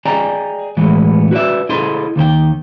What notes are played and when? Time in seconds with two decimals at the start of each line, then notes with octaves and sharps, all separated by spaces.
0.05 G#4 D5 D#5 G5 G#5 A#5
0.77 A2 E3 G#3 B3
1.31 F#4 B4 C5 D5 E5
1.69 E4 G#4 A4 D#5 C6
2.16 D#2 D#3 C5 G5